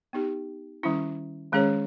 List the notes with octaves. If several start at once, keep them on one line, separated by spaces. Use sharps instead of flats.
B3 D#4 G4
D#3 G3 C#4 E4
D#3 G#3 C#4 G#4 C#5